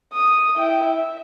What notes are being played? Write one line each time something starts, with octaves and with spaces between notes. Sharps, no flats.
D#6
E4 G5
E5